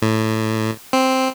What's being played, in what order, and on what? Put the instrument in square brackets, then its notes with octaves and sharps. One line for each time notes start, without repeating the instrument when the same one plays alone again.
[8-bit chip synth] A2
C4